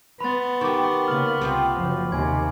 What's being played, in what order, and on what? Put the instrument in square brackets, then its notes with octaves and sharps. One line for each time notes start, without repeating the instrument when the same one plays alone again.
[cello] B3 [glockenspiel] B5 C6 A6
[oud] D#3 G4 [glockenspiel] C#6 D6
[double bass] C#3 A#3 [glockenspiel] F6 F#7
[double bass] C2 [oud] B3 C4 F4
[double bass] F#1 C#3 [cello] F3
[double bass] D#2 [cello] C3 [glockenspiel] G#5 G#6